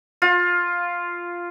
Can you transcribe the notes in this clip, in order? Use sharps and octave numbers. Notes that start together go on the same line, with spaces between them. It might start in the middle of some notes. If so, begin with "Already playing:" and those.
F4